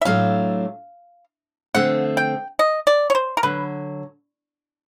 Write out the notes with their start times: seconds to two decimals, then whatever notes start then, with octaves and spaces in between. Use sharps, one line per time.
0.02 E5
0.05 A2 F#3 A3 D4 F4 F5
1.74 D3 F3 A3 C4 F#5
2.17 G5
2.59 D#5
2.87 D5
3.10 C#5
3.15 C5
3.37 A#4
3.43 D3 F#3 B4